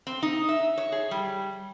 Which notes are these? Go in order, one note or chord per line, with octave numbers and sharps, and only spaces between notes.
C4
D#4
E5
C#5
G#4
G3